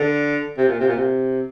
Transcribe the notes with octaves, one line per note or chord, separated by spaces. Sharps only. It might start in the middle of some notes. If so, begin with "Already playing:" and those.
Already playing: D3
C3
A#2
C3
A#2
C3